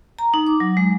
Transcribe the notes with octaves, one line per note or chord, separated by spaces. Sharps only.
A#5
D#4
D6
F#3
G#3